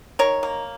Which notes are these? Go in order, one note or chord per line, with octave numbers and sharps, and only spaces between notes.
D#3 A#4 C#5
A#3